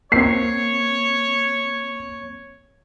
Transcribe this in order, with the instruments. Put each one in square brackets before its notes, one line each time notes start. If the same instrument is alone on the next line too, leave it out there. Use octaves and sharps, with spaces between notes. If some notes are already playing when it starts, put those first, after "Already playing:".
[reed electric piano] A#3 C4 [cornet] C#5 [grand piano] C7